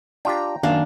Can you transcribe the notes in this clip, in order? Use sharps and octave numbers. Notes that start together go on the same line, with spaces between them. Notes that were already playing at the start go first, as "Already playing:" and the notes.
D4 F4 G4 G5 A#5
F#2 D#3 A#3 D4 F5